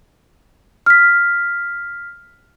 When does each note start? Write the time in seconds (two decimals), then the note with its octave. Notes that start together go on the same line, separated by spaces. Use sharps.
0.86 F6 B6